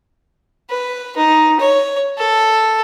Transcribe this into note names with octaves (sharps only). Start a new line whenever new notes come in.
B4
D#4
C#5
A4